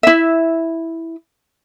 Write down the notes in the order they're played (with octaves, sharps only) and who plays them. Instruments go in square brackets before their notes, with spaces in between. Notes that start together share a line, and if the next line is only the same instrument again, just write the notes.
[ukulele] E4 E5